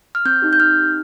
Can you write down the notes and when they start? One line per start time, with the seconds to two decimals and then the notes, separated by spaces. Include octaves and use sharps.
0.15 F6
0.25 C4 G6
0.42 D#4 G4
0.53 G6
0.60 C4 F6
0.77 D#4 G4